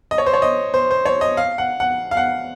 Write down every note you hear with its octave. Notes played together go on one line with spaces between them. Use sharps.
D#5
C#5
C5
C#5
D#5
C5
C5
C#5
D#5
F5
F#5
F#5
F5
F#5